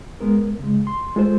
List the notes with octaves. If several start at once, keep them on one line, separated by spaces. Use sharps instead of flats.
G#3 B3 A#4
C#3 G#3
C6
G#3 F4 A4 C5